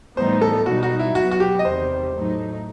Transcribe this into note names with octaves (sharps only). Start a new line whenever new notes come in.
A2 E3 G3 B3 D#4 C5
A4
B2 G3 D#4 F#4
F#4
E4
B2 F#3 B3 F#4
F#4
G4
D#5
E2 C3 D#3 G3 C5
A2 F#3 A3 D#4